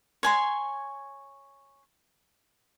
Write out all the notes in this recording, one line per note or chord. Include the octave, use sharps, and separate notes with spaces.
C#5 G#5 C6